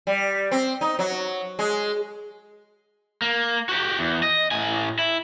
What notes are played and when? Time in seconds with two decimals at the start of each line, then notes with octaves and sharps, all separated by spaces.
0.07 G3
0.51 C4
0.81 D#4
0.99 F#3
1.59 G#3
3.22 A#3
3.69 F#4 G4
3.99 E2
4.23 D#5
4.51 A2 G#5
4.99 E4